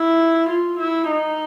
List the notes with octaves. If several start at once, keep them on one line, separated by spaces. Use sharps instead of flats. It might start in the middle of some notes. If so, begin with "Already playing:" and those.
Already playing: E4
F4
E4
D#4